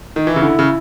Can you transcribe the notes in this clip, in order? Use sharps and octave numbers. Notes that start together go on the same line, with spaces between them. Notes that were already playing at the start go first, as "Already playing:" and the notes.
D#3
E3 E4
C#3
D3
C#3